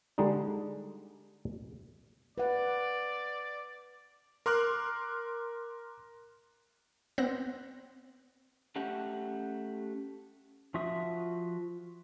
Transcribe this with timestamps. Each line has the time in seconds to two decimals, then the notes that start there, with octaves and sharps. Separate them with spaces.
0.18 D3 G3 G#3 D4 D#4
2.38 B4 D5 F#5
4.46 A#4 C6 D6 F6 F#6
7.18 B3 C4 C5 F#6 A#6
8.76 A3 C#4 G4 F#5
10.74 F3 F4 F#4 E5 D#6